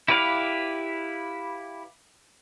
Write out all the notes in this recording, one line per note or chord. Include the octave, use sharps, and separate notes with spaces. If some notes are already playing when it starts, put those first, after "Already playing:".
E4 G4 B4 D5 F5